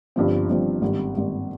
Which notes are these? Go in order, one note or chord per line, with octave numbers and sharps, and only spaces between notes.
G1 G2 F3 C4
G1 G2 F3 C4
G#1 G2 G3
G#1 G2 G3